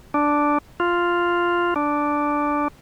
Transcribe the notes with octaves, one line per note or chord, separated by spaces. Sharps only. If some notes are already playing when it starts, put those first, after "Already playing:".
D4
F4
D4